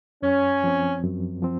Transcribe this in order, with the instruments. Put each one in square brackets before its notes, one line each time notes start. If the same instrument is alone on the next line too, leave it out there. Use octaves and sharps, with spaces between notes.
[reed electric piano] F#2 [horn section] C#4
[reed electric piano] F3 C4
F#2
F3 C4